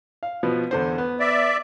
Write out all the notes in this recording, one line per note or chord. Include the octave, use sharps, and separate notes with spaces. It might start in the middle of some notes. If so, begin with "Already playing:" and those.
F5
B2 F3 B3
E2 D3 C5
B3
D5 E5